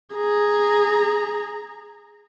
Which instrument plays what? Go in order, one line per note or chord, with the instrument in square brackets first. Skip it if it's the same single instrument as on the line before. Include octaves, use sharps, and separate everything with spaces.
[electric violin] G#4 A#5